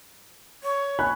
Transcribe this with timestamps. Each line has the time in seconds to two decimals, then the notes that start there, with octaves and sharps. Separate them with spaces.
0.63 C#5
0.99 G#5 B5 F#6